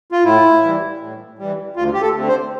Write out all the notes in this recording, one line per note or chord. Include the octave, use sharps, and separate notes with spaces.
F4
A2 E4
E3 G3
A2
E3 G3
D2 F4
G4
A4
D3 A3 C4
C5